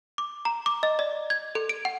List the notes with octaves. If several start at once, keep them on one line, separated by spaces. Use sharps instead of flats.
D6
A#5
D6
D#5
D5
G#6
A4
D7
F#5